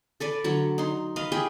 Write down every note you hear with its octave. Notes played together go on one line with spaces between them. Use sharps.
A4 B4 D5
D3 F#3
D#4 C6
B4 D#5 F5
G4 G#4 B4 G5